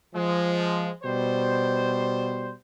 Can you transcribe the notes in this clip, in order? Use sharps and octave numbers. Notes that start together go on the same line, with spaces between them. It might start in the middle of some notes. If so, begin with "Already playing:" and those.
F3 G#3
B2 G3 C5